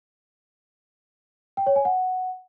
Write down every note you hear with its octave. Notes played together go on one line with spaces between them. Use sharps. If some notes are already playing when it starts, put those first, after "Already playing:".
G5
C#5
G#5
F#5